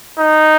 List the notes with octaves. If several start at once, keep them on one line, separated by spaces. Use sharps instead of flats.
D#4